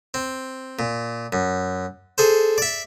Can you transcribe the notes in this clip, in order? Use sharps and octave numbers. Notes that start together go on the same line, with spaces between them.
C4
A#2
F#2
G#4 A4 C5
D5 E5